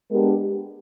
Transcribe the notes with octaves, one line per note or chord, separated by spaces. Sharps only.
G#3 B3 D4 G4 A#4